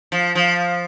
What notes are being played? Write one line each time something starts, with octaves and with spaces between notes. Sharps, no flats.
F3
F3